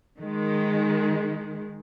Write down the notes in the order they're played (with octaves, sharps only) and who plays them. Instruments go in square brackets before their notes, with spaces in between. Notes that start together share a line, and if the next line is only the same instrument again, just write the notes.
[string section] D#3 G#3